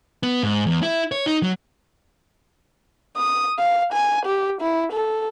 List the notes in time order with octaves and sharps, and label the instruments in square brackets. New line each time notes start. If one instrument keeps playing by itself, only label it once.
[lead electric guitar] B3
G#2
E2
E4
C#5
D#4
F#3
[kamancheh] D#6
F5
G#5
G4
E4
A4